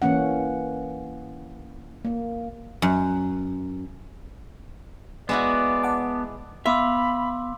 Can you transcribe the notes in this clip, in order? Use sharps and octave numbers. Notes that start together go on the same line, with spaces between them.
E3 A#3 C#4 F#5
A#3
F#2
G#3 B3 E4 F#4 D5
F#5 A5 D6
B3 E5 F5 B5 C6 D6 E6